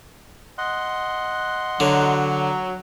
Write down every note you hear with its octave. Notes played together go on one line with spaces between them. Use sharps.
D#5 F#5 C6
D3 F#3